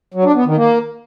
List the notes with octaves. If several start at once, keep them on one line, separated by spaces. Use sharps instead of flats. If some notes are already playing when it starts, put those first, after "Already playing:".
F#3
D4
B3
D#3
A#3